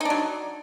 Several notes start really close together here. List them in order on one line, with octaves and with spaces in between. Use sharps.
D#4 D4 F#3